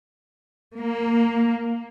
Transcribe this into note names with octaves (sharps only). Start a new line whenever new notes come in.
A#3